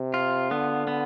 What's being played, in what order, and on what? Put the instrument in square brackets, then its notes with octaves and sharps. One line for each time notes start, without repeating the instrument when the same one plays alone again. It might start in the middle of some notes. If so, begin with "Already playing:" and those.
Already playing: [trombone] C3
[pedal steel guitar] F4
[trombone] D3 [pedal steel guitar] B3
[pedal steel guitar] B3